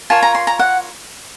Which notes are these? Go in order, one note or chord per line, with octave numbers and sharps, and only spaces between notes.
F4 A#4 C#5 A5
A#5
C6
A#5
F#5